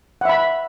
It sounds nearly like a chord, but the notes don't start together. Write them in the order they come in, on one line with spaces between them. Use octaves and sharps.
F#5 E5 B5